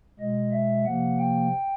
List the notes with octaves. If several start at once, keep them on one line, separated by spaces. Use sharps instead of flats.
B2 G#3 D#5
E5
C3 F3 A#3 F#5
G5